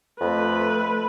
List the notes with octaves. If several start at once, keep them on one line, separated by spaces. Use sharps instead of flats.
F2 A3 B4